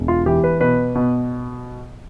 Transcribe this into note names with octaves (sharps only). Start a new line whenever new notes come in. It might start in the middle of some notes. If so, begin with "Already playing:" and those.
Already playing: E1
F4
E3 G4
B4
B2 B4
B2